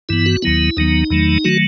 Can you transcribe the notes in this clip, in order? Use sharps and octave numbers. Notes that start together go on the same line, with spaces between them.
G2 E3 B3 E4
F#4
D#2 D#3 F#3 B3 E4
D#2 D#3 F#3 B3 D#4
E2 D#3 F#3 A3
D#3 F#3 A3 F#4